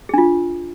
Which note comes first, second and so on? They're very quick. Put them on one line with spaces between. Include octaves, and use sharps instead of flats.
G#4 D4 F4